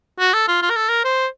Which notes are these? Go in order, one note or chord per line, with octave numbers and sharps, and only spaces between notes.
F#4
A4
F4
F4
A#4
A4
A#4
C5